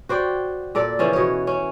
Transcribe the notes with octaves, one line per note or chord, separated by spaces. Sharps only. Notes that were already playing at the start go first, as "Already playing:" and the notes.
F#4 C5 D5 G5
A#2 A4 D5
C#3 E3 F3 C#4
B2 C#5
C#4